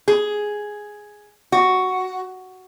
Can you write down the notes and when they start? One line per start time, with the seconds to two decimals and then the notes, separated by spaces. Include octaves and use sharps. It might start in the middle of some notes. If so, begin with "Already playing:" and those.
0.08 G#4
1.52 F#4